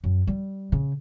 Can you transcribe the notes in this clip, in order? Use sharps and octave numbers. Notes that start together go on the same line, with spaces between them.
F#2
G3
C#3